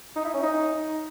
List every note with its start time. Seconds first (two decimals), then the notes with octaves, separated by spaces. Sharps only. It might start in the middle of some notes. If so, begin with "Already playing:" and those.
0.16 D#4
0.25 E4
0.34 C#4
0.43 D#4